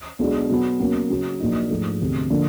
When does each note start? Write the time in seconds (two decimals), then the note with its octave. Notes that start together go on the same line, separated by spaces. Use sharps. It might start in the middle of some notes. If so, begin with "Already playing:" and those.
0.19 B1 B2 G#3 B3 D4
0.49 B2 F#3 B3
0.79 B2 F#3 A#3 C#4
1.10 C#3 F#3 B3
1.40 A#1 A#2 F#3 A#3 D#4
1.70 G#2 F3 A3
2.01 E1 D2 C3
2.30 D3 F3 A#3